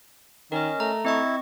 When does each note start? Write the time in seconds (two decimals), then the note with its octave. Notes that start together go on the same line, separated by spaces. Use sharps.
0.52 D#3 C#4 A#4 D#5
0.80 A3 A#5
1.05 C4 E4 D#5 C#6